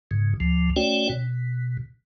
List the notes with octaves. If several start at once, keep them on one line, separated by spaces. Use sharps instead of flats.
G#2 C#3
D2 F3
A3 C#4 F#4 C#5 D5 G5
B2